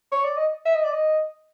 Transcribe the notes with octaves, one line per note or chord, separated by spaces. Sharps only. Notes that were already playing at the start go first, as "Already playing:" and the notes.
C#5
D5
D#5
E5
D#5
D5
D#5